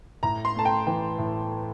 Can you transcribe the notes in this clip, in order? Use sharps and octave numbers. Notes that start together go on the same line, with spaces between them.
A2 A#5
C6
A3 A5
G5
E3 G5
A2